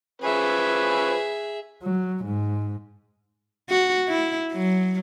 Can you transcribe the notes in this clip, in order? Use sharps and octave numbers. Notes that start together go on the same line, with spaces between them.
F3 C#4 G#4 B4 E5
F#3
G#2
F#4
E4
F#3